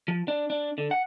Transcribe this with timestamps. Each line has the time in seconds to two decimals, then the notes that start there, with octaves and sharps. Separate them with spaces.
0.08 F3
0.28 D4
0.50 D4
0.78 D3
0.91 F#5